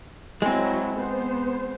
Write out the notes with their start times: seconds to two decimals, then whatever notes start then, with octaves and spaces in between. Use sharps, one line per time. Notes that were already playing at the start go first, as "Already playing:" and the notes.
0.42 F#3 G#3 C4 E4
0.97 B3 C5